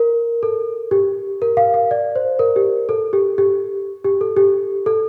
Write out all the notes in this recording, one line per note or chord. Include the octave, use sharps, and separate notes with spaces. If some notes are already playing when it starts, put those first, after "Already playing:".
Already playing: A#4
A4
G4
A#4
F5
F5
D5
C5
A#4
G4
A4
G4
G4
G4
A4
G4
A4